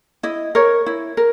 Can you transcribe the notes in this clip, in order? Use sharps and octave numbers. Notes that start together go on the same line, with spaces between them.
E4 D#5
A#4 C#5
E4
A#4